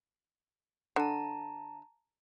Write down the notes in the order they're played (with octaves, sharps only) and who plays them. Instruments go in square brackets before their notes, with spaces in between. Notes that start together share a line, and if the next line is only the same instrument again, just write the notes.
[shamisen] D3 [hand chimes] A5 A#5